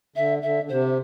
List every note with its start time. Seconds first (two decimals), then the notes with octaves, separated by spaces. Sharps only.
0.16 D3 E5
0.42 D3 E5
0.63 D3
0.69 C3 C5